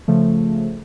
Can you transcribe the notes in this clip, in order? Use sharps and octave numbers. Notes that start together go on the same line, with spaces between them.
C#3 F3 A3